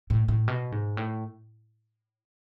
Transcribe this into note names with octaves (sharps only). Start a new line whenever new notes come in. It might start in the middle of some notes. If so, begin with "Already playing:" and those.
A2
A2
B2
G#2
A2